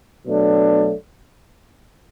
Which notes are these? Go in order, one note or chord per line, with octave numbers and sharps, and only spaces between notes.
B2 F#3 A3 D4